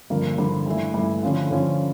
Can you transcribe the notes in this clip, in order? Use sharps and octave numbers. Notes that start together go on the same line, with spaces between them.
G2 D3 F3 A#3
G2 D3 F3 A#3
G2 E3 A3 E4
G2 E3 A3 E4
D3 F3 C#4 F4
D3 F3 C#4 F4